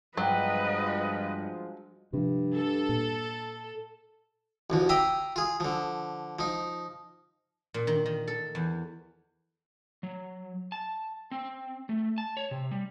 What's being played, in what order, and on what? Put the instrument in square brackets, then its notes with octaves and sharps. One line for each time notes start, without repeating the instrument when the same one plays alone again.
[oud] G2 [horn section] F3 G#3 [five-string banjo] F#3 [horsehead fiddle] B4 D#5
[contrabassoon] G2 [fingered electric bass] C3 F3
[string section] A4
[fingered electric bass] A#2
[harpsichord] A1 D2 F3
E5 F5 G5 A#5 D6 D#6
F4 G#4
D3 F3
F3 D#4
[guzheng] A#2
D#3
D#3
A4
E2
[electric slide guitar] F#3
A5
C4
A3
A5
C#5
C3
G3